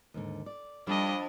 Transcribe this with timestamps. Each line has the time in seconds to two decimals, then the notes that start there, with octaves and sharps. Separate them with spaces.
0.14 D#2 G#2 D3
0.46 D5
0.87 F2 G3 D4 A4 D#5